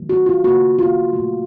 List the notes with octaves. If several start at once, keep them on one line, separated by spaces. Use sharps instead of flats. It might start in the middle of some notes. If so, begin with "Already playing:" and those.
Already playing: D#3 F#3 A3
F#4
F4
C#3 F#3 A#3 F#4
F4
A#2 F#3 A3